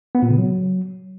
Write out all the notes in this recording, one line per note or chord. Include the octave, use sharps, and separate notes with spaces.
B3
A#2
C#3
F#3